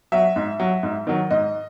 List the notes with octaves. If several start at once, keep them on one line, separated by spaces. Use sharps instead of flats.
F#3 E5
G#2
F#3
G#2
D#3 F#3
G#2 D#5